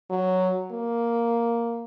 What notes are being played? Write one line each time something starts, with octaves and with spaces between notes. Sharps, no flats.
F#3
A#3